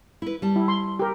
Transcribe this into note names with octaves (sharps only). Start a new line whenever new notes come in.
E4 B4
G3 A5
E4
C6
G4 A#4